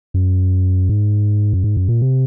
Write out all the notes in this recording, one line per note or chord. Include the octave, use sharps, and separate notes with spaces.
F#2
G#2
F#2
G#2
F#2
A#2
C3